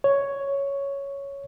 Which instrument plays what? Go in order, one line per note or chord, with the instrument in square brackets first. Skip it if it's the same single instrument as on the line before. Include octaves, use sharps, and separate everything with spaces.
[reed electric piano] C#5